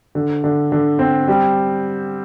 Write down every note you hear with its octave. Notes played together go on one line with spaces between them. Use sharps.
D3
D3
D3
C4
G3